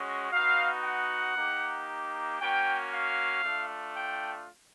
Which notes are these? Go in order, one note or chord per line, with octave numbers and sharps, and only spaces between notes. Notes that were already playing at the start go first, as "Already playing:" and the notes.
Already playing: G#3 C#4 F#4
B3 D#4 F#4 F5
F#5
A#3 D#4 G4
A#3 C#4 F#4 G5
F5
A3 D4 F4
G5